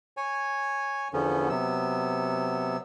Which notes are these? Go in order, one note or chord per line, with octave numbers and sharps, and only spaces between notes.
C#5 G#5
E2 D3 F3 B3 C#4
C3 F#3 B3 E6